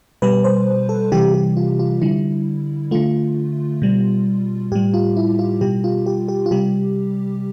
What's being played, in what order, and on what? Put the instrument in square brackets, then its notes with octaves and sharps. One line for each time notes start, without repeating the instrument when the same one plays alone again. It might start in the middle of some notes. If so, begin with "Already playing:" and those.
[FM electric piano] B2 G3 B4
C5
A4
C3 E3 G3 G4
G4
F4
F4
D3 G3 E4
D3 A3 F4
B2 G3
A2 G3 G4
F4
E4
F4
B2 G3 G4
F4
G4
G4
F4
C3 G3 G4